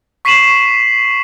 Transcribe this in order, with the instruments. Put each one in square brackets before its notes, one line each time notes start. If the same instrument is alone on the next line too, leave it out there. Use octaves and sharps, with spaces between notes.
[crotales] C#6 B6 C7 D#7 E7 F#7